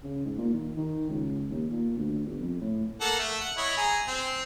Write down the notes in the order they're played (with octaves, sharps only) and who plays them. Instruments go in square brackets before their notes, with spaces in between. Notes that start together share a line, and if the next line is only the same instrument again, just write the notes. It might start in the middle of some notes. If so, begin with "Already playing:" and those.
[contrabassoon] C#3
G#2
A#2
D#3
D#3
C#2
D#2
A#2
D2
G1
F2
A2
[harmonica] A#3 A4 F#5
A3
F#5
E4 C#5 D#5
G#4 A#5
C4